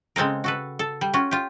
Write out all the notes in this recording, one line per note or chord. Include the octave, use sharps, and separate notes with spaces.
C#3 G#3 C4 A4 A#4
F#4 A4 B4
A4
G3
C#4 F4 F#4
F4 G4